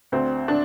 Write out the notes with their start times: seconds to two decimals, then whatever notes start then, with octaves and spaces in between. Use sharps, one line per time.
0.12 D2 C4
0.48 D4